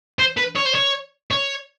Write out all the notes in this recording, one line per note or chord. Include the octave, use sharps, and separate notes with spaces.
C5
B4
C#5
C5
C#5
C#5